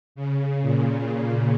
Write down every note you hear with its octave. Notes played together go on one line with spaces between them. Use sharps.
C#3
A#2